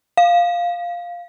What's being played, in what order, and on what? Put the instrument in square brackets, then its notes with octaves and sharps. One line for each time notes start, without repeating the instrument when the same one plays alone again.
[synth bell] F5